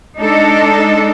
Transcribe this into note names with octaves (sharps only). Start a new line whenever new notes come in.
G#3 D4 D#4 A4